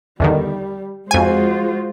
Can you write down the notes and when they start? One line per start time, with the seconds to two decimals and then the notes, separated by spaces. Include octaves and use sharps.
0.20 E2 D3 D#3 G3
1.11 F2 G#3 F4 F#4 C5 G#5